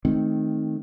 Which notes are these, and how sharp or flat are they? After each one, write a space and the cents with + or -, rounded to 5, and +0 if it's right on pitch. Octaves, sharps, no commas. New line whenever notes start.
D#3 +0 A3 -25 C4 +0